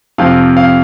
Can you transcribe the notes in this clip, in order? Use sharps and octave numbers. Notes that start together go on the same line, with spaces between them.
F2 C3 F3 F5
F5